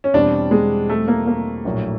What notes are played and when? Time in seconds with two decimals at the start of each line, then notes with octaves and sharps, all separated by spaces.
0.04 C#4
0.14 E2 B2 G3 C4 D4
0.51 G#3
0.89 A3
1.08 A#3
1.27 A#3
1.65 A#1 A2 F#3